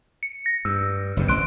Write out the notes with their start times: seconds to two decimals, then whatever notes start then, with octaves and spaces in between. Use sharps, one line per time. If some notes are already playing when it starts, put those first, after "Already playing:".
0.23 C#7
0.46 A#6
0.65 G2 E6
1.17 F#1 G2 C3
1.28 G#1 C6 F#6 D7